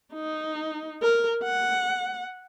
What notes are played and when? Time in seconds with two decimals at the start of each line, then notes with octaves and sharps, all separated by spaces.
0.14 D#4
1.02 A#4
1.44 F#5